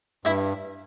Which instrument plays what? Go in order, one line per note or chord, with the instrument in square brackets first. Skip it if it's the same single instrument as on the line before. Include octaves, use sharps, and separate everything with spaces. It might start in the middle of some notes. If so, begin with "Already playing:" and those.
[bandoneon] G2 [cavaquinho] E4 E5